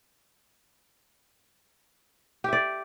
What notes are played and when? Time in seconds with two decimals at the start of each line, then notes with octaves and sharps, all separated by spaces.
2.44 G4
2.48 E5
2.53 D5